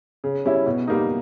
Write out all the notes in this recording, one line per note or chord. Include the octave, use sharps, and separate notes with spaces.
C#3
G3 C#4 E4
B2
G3 A#3 D#4